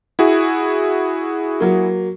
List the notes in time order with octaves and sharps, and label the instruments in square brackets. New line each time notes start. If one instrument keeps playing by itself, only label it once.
[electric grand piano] E4 F#4 G#4
[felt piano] F#3 A#3